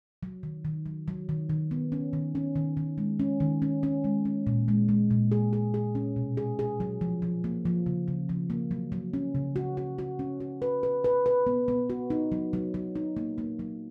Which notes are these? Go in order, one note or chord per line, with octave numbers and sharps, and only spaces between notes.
F#3
D#3
D#3
F#3
F#3
D#3
D#3
B3
C#4
D#3
C#4
D#3
D#3
G#3
C#4
D#3
C#4
C#4
G#3
C#4
A#2
G#3
G#3
A#2
G#4
G#4
G#4
C#4
B2
G#4
G#4
F#3
F3
F3
A#3
F3
C#3
C#3
F3
A#3
F#3
F#3
C#4
C#3
F#4
F#4
F#4
C#4
F#4
B4
B4
B4
B4
B3
B3
F#4
D#4
F#3
F#3
F#3
D#4
A#3
A#3
F#3